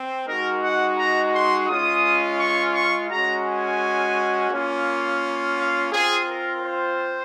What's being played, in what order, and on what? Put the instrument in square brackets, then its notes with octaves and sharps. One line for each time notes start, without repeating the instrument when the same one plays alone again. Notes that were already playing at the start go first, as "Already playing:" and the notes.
Already playing: [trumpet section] C4
G#3 D#4 F#4 A#4
F#5
A#5
C6
G#3 C#4 F4 D#6
C#6
C#6
G#3 C#4 F#4 A#5
G#5
A#3 C#4 F4
F5
C4 F4 G#4
A#4
C5